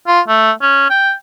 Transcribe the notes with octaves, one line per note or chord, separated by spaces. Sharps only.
F4
A3
C#4
G5